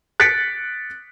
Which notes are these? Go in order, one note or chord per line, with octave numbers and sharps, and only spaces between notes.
F#6 A6 B6 C#7 D7